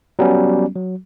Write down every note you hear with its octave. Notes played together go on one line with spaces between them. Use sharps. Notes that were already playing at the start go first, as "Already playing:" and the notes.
F#3 G3 B3 C#4
F#3